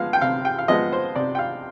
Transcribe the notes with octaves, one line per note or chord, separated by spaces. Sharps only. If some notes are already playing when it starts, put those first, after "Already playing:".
Already playing: F3 G#3 B3 F5
G5
C3 F5
G5
F5
F3 G#3 B3 D#5
C5
C3 D5
G5
F5